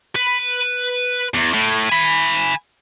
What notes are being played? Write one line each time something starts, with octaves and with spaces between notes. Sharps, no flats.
B4
E2
A2
G#5 B5